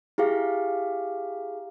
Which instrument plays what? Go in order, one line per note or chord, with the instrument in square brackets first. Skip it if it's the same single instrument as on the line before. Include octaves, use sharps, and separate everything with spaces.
[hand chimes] E4 G4 G#4 F5